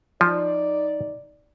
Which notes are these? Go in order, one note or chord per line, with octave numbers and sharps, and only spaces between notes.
F3 D#4 D5